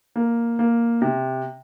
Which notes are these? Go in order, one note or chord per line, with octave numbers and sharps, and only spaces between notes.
A#3
A#3
C3